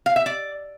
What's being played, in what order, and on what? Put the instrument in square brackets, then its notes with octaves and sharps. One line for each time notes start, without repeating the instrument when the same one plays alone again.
[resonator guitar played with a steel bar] F5
E5
D5